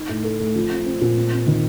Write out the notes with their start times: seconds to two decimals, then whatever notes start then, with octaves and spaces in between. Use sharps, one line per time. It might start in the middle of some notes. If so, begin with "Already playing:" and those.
Already playing: D#4
0.09 A2
0.24 A4
0.40 A3
0.56 F3
0.71 C4
0.86 C4
1.01 A#2
1.17 C4
1.32 C4
1.47 D#3